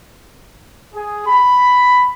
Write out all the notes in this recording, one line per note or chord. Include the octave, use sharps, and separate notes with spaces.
G#4
B5